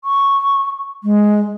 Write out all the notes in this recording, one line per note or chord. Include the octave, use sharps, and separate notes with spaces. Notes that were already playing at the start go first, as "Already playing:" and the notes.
C#6
G#3